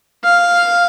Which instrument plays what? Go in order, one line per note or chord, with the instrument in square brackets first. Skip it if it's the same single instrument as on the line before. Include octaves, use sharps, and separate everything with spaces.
[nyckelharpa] F5